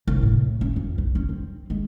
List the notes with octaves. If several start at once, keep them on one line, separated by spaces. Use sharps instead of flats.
C2
A2
C#4
F2
B1
C#4
C4
G#3